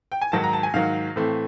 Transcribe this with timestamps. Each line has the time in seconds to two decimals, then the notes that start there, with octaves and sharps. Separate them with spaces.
0.12 G5
0.21 G#5
0.32 G#2 D#3 F#3 A5
0.44 A#5
0.53 A5
0.63 G#5
0.74 G#2 D#3 F#3 F5
1.16 A2 E3 A3 C4